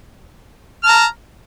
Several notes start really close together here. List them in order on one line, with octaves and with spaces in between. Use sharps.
F6 A5 A#5